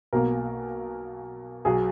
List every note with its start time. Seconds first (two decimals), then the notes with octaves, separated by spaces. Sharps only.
0.13 B1 B2 A#3 A#4
1.65 B1 B2 F#3 G#4